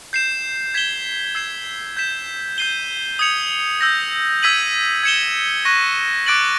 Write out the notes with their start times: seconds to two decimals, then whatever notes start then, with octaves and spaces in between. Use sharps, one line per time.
0.13 G6 C7 E7
0.74 G#6 B6 E7 G7
1.35 E6 G#6 C7 E7
1.97 G6 B6 E7
2.58 G6 C7 D#7 G7
3.19 D#6 G#6 C#7 F7
3.81 E6 G6 A#6
4.43 E6 G#6 B6 D#7 F#7
5.03 G#6 C#7 E7 G7
5.65 C#6 F#6 A#6 D#7
6.26 D6 F#6 A6 D7 F#7